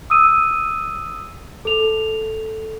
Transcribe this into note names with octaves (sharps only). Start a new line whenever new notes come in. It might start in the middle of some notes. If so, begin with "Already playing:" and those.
D#6 E6 D#7
A4 F7